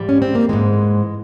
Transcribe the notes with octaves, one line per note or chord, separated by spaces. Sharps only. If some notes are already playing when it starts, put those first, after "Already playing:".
Already playing: G#2 E3 G3
C#4
C4
A#3
G#2 E3 G#3